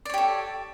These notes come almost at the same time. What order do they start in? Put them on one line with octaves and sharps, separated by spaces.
D5 C#5 G4 A4